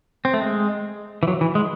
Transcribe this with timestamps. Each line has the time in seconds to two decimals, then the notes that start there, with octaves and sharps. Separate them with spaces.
0.25 C4
0.34 A3
0.42 G#3
1.23 E3
1.28 F#3
1.41 E3
1.55 G#3